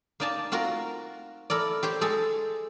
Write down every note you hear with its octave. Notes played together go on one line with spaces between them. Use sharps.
A#3 D#4 D5 G#5 A5
C4 F4 F#4 A#4
E4 A4 A#4 D5
G4 C5 C#5
G#3 G#4 A4